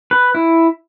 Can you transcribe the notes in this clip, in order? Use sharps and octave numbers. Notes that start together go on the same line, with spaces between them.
B4
E4